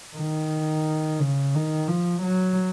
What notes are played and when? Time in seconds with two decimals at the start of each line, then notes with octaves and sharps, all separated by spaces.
0.16 D#3
1.20 C#3
1.55 D#3
1.88 F3
2.23 F#3